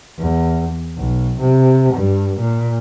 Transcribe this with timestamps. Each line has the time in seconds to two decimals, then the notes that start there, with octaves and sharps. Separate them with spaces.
0.19 E2
0.98 B1
1.40 C3
1.94 G2
2.40 A#2